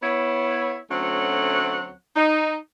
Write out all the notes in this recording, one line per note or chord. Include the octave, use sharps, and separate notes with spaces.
B3 E4 C#5
D2 F#3 A3 C4 C#4 F#5
D#4